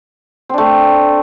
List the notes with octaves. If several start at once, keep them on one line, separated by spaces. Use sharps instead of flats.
A3 C4 D4